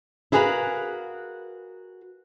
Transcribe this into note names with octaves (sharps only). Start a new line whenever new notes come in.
E4 F#4 G#4 A#4 B4 F5